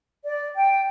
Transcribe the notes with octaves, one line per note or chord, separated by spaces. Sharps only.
D5
G5